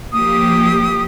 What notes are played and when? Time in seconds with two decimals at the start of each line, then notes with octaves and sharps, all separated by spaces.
0.13 F3 A#3 G4 D#6